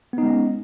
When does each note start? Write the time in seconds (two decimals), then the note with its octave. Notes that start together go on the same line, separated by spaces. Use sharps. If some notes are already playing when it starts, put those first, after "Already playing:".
0.13 B3
0.18 D#4
0.23 G#3
0.28 C#4